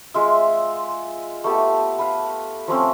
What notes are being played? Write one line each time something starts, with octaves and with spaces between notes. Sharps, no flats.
G#3 F4 E5
A3 B3 G4 A5
B4 F5
F3 A3 C4 C#4